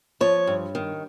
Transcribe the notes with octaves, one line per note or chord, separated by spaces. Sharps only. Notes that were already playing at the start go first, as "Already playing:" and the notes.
F3 C#5
G2
D#3